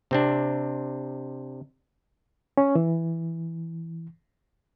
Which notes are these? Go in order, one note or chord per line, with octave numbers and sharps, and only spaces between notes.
C3 C4 D4
C#4
E3